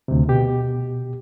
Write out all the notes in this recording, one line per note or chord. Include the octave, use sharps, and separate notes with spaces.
D2 C3
B2 G4